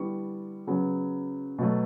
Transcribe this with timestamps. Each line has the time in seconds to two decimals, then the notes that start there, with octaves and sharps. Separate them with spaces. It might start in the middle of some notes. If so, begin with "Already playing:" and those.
Already playing: D3 G3 B3 E4 C#6
0.67 C#3 F#3 B3
1.59 B2 F#3 A3